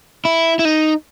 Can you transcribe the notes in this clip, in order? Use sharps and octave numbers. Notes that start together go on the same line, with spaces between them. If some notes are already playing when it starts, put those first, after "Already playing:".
E4
E4
D#4